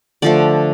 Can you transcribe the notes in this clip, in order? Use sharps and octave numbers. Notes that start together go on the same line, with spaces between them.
D3 F3 A3 D5